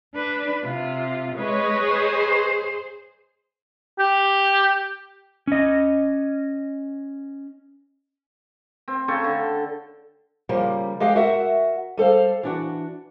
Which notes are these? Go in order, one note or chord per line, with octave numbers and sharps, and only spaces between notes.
D4 B4
C3 F4
G#3 B4 C#5 D#5
G#4 C5
G4
C#4 D#5
C4
C#3 A4 G5 C#6
D3
C#3 F3 G3 A#3
G#3 G4 D#5 F5 G5
F#4 A#4 E5 F#5
G3 A4 C5 F5
E3 D4 F#4